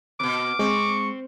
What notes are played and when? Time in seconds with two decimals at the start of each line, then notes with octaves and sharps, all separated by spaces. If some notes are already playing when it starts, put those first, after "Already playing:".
0.20 F2 B2 D6
0.59 G#3 C4 C#6